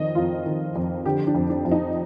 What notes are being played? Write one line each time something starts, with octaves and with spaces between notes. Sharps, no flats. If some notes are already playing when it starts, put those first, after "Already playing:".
Already playing: F2 D#3 D#5
F2 F4
D#3
F2
D3 G4
D4
F2
D4
F2
D#4